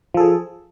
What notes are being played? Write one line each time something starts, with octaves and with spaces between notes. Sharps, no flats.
F3 G#4 A4